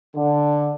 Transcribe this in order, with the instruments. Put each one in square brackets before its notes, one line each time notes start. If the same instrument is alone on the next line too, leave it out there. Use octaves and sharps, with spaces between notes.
[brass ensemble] D3